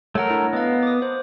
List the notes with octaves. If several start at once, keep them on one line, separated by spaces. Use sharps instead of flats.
A3 A#4 C#5 F#5
D4 E4
B3 D#5 F5
D6 D#6
C5